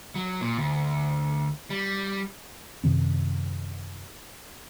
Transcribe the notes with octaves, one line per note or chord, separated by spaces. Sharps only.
F#3
A#2
D2
G3
F#2 C3 D#3 C4